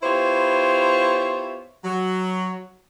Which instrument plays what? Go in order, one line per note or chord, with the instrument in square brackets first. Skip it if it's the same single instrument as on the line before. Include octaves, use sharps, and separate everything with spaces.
[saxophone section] B3 E4 F4 G4 C5 C#5
F#3